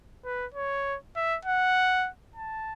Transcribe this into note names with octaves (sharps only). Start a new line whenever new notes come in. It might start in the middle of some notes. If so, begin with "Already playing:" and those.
B4
C#5
E5
F#5
A5